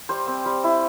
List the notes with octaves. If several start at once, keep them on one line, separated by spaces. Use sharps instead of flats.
G3 C5
C4
G3
E4